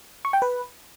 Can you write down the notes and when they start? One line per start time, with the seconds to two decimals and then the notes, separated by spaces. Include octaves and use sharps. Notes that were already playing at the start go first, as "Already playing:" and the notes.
0.25 C#6
0.33 G5
0.42 B4